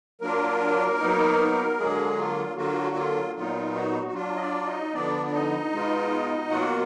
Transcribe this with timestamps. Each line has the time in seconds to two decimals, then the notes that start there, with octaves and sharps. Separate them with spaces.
0.21 F#3 A#3 D4 F4 A#4
1.00 F#3 B3 D#4
1.78 D3 F#3 G#3 A#3 G#4
2.18 F4
2.57 D3 F#3 A#3 F4 F#4
2.96 F4
3.36 A#2 F#3 B3 D#4 F4
3.74 F#4
4.07 F#4
4.14 F#3 D4 F4
4.35 D#5
4.40 D4 D5
4.66 D#4 D#5
4.93 D3 F3 B3 D4 D5
5.26 D5
5.32 D#4 D#5
5.72 B2 G#3 B3 F4
6.50 B2 F#3 A#3 F4 F#4 F#5